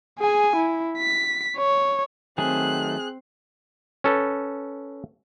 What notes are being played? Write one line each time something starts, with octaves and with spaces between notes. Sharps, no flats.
G#4 G#5
E4
B6
C#5
D#3 F#3 A3 C4 G#4 F#6
C#4 A4 B4